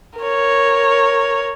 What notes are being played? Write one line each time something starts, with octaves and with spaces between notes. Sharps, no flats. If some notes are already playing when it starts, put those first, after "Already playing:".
A#4 C#5